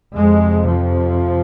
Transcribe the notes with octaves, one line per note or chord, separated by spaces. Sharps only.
F2 C3 G#3
F3